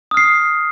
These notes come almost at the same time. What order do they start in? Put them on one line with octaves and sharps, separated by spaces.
D#6 F6 C7